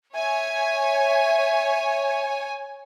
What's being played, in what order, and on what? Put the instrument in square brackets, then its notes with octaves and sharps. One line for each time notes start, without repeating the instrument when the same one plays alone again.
[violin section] C#5 G#5 [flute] E5